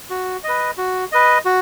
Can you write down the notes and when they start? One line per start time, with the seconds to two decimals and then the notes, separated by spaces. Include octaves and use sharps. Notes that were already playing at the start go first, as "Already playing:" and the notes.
0.10 F#4
0.44 B4 D#5
0.78 F#4
1.12 B4 D#5
1.45 F#4